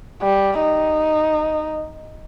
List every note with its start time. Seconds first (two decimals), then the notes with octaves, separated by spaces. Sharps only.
0.22 G3
0.61 D#4